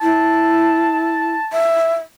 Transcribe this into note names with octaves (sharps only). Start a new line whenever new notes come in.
E4 A5
E5